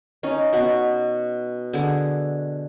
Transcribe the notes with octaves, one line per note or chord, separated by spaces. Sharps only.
C#4 D#4
B2 F#5 C#6
D3 G#4